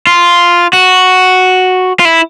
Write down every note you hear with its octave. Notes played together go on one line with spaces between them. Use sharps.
F4
F#4
F4
E4